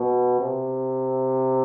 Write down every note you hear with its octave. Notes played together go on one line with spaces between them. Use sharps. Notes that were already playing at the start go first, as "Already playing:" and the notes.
Already playing: B2
C3